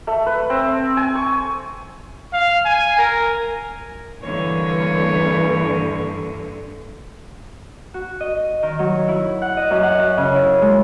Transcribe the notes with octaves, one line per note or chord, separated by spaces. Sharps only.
A3
B4
C4
G#5
C#6
F5
G#5
A#4
G2 D3 E3 A#3 C#5
F#4
D#5
D#3
F#3
E4
F#5
D#5
F#2
F#5
C#3
E4
G#3